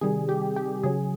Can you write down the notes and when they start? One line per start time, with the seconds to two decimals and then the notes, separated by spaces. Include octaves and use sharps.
0.01 C3 D#3 G3 G#4
0.29 G4
0.56 G4
0.83 C#3 F#3 G#4